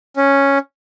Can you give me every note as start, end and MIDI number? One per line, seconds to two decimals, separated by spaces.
0.17 0.58 61